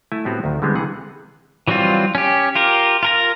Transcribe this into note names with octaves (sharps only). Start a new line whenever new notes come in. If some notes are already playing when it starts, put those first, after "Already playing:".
A3 E4 G#5 A5
A2 B3 C4 F#4 G4
D2 D#3
D3 E3 G3 G#3 B3 C4
C3 E3 G#4 F#5
E3 F#3 G3 C4 F4
C#4 G4
F4 G4 A#4
F4 A#4 A#5